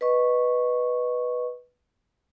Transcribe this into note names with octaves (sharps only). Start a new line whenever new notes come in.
B4 D#5 C#6